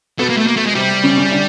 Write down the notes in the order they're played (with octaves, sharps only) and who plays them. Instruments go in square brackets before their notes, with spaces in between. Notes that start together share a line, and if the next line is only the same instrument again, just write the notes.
[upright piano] B2 B3 [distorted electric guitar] A3
[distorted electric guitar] A#3
A3
A#3
A3
G#3
[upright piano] C3 C4 [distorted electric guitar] G3
[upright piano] C#3 C#4
C#3 C#4
D3 D4